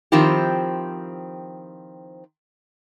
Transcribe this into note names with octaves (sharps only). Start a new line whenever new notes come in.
D#3 F3 C4 E4 G4